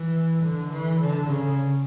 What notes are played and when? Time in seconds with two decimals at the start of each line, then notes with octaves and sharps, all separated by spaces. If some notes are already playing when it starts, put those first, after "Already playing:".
Already playing: E3
0.44 D3
0.72 E3
1.01 D3
1.28 C#3